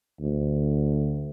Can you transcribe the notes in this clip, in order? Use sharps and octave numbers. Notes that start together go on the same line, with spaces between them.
D2